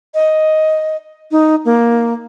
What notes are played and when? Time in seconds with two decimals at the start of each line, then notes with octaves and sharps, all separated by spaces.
0.14 D#5
1.31 D#4
1.65 A#3